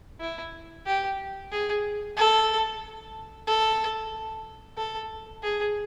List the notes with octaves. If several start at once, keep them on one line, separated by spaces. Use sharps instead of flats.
E4
G4
G#4
A4
A4
A4
G#4